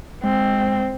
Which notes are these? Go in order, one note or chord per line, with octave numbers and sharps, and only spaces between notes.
G#3 C4